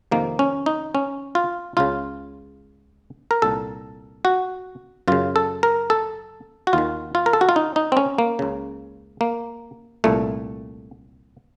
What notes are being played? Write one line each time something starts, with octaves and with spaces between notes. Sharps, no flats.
F2 C3 D#3 A#3
C#4
D#4
C#4
F4
C#2 C#3 F4
A#4
C2 A#2 A4
F#4
F#2 C#3 F4
A4
A#4
A4
F#4
D#2 D#3 F4
F4
A#4
A4
F#4
F4
D#4
D#4
C4
C#4
A#3
C#2 C#3
A#3
C2 A#2 A3